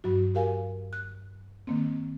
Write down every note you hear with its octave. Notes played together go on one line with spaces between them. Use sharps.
G2 F#3 F#4
G4 A#4 F5 G#5
F#6
D#3 A#3 C4